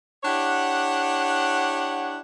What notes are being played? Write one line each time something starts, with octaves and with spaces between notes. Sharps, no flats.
D4 E4 G4 C#5 F#5